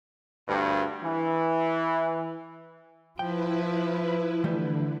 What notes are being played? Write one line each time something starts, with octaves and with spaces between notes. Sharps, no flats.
D2 G2
E3
F3 E4 B4 G5
D3 E3 G3 A3